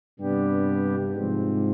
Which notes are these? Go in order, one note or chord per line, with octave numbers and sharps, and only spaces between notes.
G2 C3 G3 B3 D4 G4
G#2 C3 F3 C4